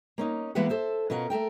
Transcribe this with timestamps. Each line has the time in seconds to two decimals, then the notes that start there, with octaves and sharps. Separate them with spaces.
0.18 A#3 C#4 D#4
0.55 E3 G#3 A#3 B3 B4 F#5
0.69 A4 C5 E5
1.10 B2 C#4 F4 A#4 F#5
1.30 A3 A4 A#4 G5